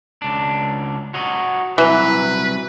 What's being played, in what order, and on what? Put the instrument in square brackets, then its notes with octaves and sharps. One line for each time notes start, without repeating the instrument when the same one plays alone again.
[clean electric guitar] C#2 D4
F#4 C#5 D#5
[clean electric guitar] C2 F#3 [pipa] E3 [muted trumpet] B4